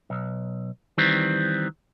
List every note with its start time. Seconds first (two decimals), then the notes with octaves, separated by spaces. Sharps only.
0.10 B1
0.98 D#3 E3 G3 C4